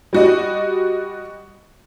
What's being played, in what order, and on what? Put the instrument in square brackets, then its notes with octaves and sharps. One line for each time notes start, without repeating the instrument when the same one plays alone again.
[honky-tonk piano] G3 F#4 D#5